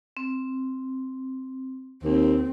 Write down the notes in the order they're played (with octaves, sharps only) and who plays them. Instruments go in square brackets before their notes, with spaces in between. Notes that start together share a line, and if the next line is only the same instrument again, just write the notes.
[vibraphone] C4
[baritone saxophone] D#2 [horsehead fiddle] C4